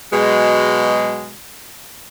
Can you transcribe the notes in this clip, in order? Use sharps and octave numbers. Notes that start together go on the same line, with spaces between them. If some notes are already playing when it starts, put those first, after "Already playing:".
B2 F#3 G#3